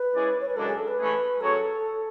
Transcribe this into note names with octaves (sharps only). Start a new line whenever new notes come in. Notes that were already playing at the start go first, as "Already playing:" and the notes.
Already playing: B4
G#3 C#4 E4 G#4 D5
C#5
B4
F#2 C#3 G#3 D4 A4
G#4
A4
B4
E3 A3 C#4 G#4
F#3 C#4 G#4 A4 C#5